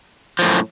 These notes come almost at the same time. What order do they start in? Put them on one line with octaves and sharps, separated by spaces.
F3 A2 F#2